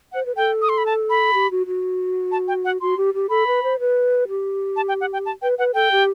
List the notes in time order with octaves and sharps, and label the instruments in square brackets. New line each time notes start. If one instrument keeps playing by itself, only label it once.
[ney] C5 [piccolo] F#5
[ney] B4
[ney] A4 [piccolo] G5
[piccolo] D#6
C6
B5
A5
B5
[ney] G4
F#4
F#4
[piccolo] A5
G5
F#5
[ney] F#4 [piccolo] C6
[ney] G4
G4
[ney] A4 [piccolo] B5
[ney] B4
C5
B4
G4
[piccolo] A5
G5
F#5
G5
A5
[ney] B4 [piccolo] G5
[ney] B4 [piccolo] F#5
[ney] A4 [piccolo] G5
[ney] G4